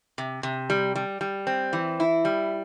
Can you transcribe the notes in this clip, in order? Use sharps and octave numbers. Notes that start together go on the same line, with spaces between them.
C3
C3
G3
G3
G3
C4
E3
E4
G3